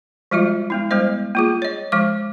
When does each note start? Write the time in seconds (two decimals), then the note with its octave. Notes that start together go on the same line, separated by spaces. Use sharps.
0.31 F3 G3 G#3 F4 F#4 E5
0.70 G#3 B3 E4
0.91 G3 G#3 B3 C5 D#5
1.35 A#3 F4 G#4
1.62 C#5 D#5
1.92 F3 G#3 D6